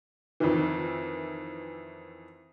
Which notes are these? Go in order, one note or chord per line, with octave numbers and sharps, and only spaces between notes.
F2 D#3 E3